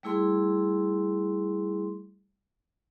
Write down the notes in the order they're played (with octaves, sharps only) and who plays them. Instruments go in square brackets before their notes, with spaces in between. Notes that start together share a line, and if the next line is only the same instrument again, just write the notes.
[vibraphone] G3 A3 E4 G#4 C6